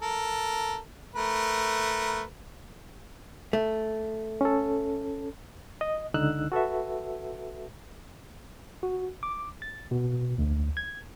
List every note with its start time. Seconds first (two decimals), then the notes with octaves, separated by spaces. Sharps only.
0.02 A4 A#4
1.15 A3 A#4 B4
3.53 A3
4.41 C#4 A4
5.81 D#5
6.14 C#2 D3 D#4 E6 F#6
6.52 F#4 A4 B4 E5
8.83 F#4
9.23 D6
9.62 A6
9.91 B2
10.38 D2
10.77 G#6